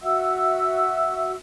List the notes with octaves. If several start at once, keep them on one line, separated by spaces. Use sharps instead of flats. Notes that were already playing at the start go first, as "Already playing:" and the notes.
F#4 E5 F#5 E6